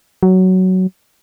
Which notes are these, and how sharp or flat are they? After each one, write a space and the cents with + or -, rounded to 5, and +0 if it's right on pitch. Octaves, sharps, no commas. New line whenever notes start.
F#3 +10